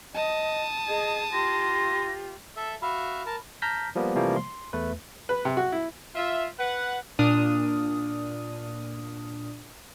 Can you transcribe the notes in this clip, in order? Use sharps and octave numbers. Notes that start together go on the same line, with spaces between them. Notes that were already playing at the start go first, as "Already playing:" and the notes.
D#5 A5 D#6
G#4 D#5
F4 G4 C6 A#6
A4 E5
F#4 E5 F5 B5
A#4 A5
A5 A#5 F6 G6 A#6 B6
F3 G3 A#3 B3
C3 E3 F3 G3 A3 A#3
C6
E2 A3 B4
B4
C3
F#4
E4
F4 E5
B4 F#5
A#2 D4 D#6 F6